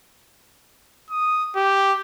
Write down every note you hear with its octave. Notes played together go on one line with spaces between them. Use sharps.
D#6
G4